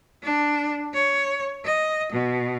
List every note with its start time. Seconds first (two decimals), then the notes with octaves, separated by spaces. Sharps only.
0.23 D4
0.94 C#5
1.65 D#5
2.13 B2